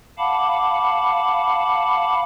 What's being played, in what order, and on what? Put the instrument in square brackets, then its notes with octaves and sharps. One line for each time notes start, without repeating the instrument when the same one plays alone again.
[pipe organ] F5 F#5 A5 B5 D6